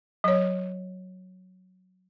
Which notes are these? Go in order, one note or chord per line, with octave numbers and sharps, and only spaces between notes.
F#3 C#5